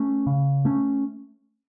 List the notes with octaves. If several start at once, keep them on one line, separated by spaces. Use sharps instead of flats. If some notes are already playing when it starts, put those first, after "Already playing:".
Already playing: A3 C#4
C#3
A3 C#4